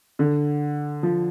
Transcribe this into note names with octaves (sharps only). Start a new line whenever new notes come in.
D3
F3